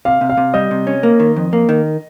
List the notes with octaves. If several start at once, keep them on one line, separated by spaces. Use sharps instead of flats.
C3 F5
C3
F5
C3
G3 D#5
C3
C#4
A#3
D#3
F2
A#3
D#3